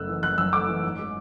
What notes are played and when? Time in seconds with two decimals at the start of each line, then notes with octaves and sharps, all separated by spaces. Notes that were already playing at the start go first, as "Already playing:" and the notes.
Already playing: F#1 F#2 A3 E6 F#6
0.08 E3
0.23 F#1 F#6
0.38 F#2 E6
0.53 A3 D6
0.68 E3
0.84 G#2
0.99 G#3